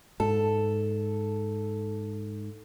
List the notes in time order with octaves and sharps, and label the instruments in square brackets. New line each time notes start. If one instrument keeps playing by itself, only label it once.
[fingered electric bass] G#2 [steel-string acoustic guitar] A4